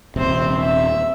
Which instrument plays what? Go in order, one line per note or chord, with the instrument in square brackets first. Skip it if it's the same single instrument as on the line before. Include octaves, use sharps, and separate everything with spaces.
[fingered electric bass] D#1 C3 [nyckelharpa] C4 C5
[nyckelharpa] E5